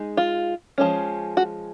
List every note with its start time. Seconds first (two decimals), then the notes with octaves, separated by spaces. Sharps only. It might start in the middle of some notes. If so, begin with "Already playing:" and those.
Already playing: G#3 D#4
0.17 F4
0.78 F3 G#3 C#4
1.37 F#4